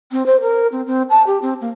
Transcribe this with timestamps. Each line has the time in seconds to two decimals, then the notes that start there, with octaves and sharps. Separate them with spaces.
0.12 C4
0.26 C5
0.41 A#4
0.72 C4
0.86 C4
1.10 A5
1.27 G4
1.42 C4
1.61 A#3